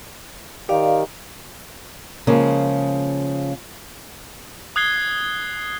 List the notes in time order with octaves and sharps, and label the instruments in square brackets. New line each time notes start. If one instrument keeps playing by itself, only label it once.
[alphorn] D#3 [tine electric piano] G4 [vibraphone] D5 F5
[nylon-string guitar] C#3 F3 G#3 A#3
[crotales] D#6 F#6 G#6 C7 G7